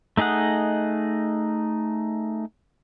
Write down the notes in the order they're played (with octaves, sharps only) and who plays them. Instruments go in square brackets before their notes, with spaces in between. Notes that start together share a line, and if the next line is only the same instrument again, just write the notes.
[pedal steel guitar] A3 D#4 G#4 D#5 F#5